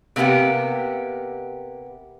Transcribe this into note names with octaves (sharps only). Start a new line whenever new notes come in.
C3 A#3 B3 G4 F#5